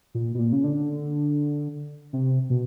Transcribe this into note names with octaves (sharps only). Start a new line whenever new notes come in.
A#2
B2
A#2
C#3
D3
C3
B2